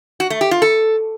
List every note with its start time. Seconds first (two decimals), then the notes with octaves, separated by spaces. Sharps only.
0.20 F#4
0.30 A3
0.41 G4
0.51 F4
0.62 A4